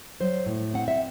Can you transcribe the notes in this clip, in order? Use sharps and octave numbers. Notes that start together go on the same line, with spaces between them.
F#3 C5
A2
C4 F#5
E5